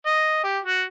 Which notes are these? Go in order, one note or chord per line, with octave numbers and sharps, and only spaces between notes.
D#5
G4
F#4